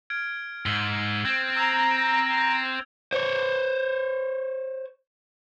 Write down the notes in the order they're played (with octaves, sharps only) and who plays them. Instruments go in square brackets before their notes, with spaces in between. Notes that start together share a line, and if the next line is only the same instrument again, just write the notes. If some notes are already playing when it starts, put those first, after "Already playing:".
[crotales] F6 G#6 D7
[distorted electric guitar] G#2 [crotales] E6 F#7 G7
[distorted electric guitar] C4 [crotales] G#6
[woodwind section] A#5 [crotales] E6 G#6 F7
[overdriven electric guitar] C5 C#5